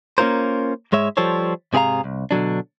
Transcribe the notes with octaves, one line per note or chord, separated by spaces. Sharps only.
A#3 C#4 D#4 F4 A#4 C5
G#2 G#3 C#5 E5
F3 G3 A4 C5 C#5
G#2 C3 G#4 A#4 F5 A#5
C2
B2 D3 F#3 D4